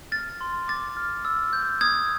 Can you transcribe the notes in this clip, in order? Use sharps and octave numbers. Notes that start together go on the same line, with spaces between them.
F6 A6
C6
D6 A6
F6
E6
G6
D#6 G#6